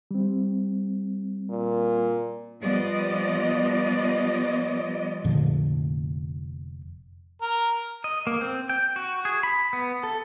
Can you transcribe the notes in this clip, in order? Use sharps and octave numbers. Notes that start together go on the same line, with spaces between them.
G3 C4
A#2
F3 G3 B3 D5 D#5
F1 A#2 D3 F3
A#4
D#5
A#3
C4
G5
F#4
G#4
B5
B3
A4